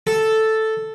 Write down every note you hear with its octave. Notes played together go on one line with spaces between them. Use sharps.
A4